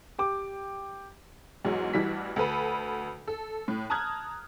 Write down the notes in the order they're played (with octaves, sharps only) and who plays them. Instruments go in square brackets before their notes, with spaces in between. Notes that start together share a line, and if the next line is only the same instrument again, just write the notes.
[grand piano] G4 G5 D6
[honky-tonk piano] E2 G#2 F#3
A1 G2 E3 G3 F#4 B6
D2 A4 B4 B5
A4
A2
A5 A#5 D#6 F6 F#6 G#6